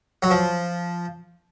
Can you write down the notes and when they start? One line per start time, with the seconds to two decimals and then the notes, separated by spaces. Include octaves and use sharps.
0.22 F#3
0.30 F3